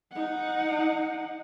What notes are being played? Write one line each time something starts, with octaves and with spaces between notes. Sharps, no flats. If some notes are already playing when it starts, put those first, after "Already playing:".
D#4 F#5